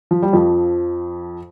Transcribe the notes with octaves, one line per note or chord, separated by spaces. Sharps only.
F3
G3
F2 F3